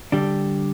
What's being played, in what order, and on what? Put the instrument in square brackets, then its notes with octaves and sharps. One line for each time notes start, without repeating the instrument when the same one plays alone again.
[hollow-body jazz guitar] D3 G3 D4 G4